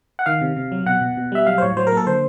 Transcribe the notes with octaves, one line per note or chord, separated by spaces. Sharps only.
F#5
D#3 F5
C3
C3
F#3
B2 F#5
B2
B2
G3 E5
F#3 F5
C5
A2 C#5
F#3 C5
A#4
A#3
A4
D3 C5